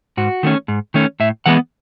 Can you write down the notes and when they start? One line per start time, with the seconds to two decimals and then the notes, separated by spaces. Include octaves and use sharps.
0.17 G#2 F#4
0.43 D#3 A3 C#4
0.68 G#2
0.94 D#3 A3 C#4
1.20 A2 E5
1.46 E3 G#3 B3 F#5